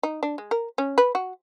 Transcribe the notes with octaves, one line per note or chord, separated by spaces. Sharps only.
D#4
D4
G#3
A#4
C#4
B4
F#4